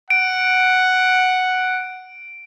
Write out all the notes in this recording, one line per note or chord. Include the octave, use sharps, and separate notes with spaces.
F#5 D7